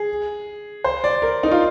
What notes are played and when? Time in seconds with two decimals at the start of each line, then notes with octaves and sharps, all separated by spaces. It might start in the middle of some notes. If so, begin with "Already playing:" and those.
Already playing: G#4
0.84 C5
1.04 D5
1.22 A#4
1.43 D#4
1.51 F4